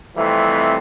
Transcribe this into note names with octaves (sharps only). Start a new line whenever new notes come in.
F2 C3 E3 G3 A3